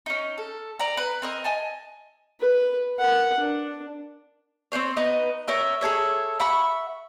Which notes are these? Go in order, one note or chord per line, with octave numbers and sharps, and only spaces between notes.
C#4 D#4
A4
D5 A#5
B4
C4 A#4 D#5
D#5 G#5 A5
B4
A#4 F#5
D4
C4 C#4 C5 C#5
B3 D#4 B4 D#5
C#4 A#4 E5 G5
G#4 A4 C#5 E5
E5 F#5 B5 C#6